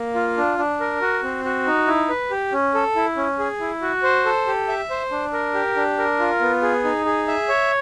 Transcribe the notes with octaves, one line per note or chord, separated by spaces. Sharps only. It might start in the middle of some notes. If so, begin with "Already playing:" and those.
Already playing: A#3
F4
D4
D4
A#4
F#4
C4
F#4
D#4
E4
B4
G4
C#4
A4
E4
C#4
G#4
E4
F#4
C5
A4
G4
E5
C5
D4
A#4
G4
D4
A#4
F4
B3
G#4
D#4
G#4
E5
C#5